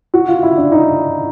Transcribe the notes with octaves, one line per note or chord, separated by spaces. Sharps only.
F#4
F4
E4
D4
D#4